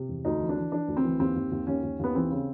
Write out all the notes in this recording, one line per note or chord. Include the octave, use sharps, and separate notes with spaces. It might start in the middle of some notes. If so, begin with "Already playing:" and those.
Already playing: C3
E2
D2 D#4
E3
D4
E3
E3 D4
D2
C4
E3
D#2 C4
D#2
D#2
D#2 C#4
D#2
D#2 B3
E3 C4
C#3